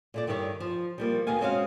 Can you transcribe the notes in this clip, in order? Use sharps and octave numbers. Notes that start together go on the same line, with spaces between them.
A#2 A3 D5
G2 D#3 E4 G4 A#4 C#5
F3
F3 G3 A#3
D#2 B2 A#3 F5 G#5
G#3 C4 C#4 F#4 D#5 F5